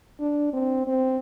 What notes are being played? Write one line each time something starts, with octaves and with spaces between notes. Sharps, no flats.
D4
C4
C4